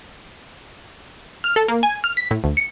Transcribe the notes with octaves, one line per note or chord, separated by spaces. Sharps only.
F6
A4
A#3
G#5
F6
B6
A2
D2
C#7